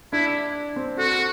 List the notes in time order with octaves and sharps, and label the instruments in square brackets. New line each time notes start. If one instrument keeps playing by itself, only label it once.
[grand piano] D4 [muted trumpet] E4
[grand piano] C4
[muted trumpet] F#4 [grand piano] A4